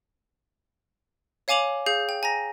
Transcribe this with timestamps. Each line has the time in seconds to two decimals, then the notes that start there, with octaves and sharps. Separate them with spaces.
1.48 C#5 F5 G#5 D6 F7 F#7
1.86 G#4 F5 G6
2.09 G5
2.23 G#5 A#5 A#6